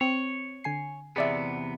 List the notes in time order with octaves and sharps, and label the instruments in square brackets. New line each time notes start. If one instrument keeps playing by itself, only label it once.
[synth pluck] C4 [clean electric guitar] C#5
[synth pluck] D3 G#5 C7
[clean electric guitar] E2 C3 B3 [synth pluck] G#4 D5 E5